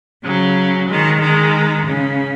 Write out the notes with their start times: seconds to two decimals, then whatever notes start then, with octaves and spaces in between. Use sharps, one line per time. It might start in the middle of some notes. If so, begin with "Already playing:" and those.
0.23 C#3 F#3
0.88 D#3 G#3
1.20 D#3 G#3
1.86 C#3